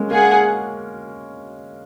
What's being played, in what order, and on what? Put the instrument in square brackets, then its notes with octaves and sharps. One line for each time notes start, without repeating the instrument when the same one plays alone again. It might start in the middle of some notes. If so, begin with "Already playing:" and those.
Already playing: [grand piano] G#3 A#3 C#4
[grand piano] A#3 [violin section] G#4 F#5